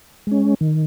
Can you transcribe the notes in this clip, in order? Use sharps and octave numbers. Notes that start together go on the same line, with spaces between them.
G#3 C#4
D#3